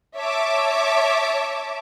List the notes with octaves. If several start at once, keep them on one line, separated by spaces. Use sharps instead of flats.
C#5 E5 A5 D6